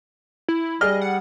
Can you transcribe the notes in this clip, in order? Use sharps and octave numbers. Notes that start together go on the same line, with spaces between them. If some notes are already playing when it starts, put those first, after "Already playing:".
E4
G3 G#4 D5 D#5 F6
F#5